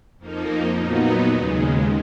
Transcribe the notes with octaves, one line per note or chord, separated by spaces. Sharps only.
F2 F3 A#3 D#4
A#2 F#3 B3 D#4
D#2 C#3 G#3